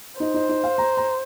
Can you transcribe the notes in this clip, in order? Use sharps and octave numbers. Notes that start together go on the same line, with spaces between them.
D#4 C5
D#4
D#4
F5
A#5
A#5